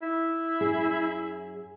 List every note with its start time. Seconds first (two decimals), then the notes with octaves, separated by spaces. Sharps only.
0.02 E4
0.60 F#2 G#4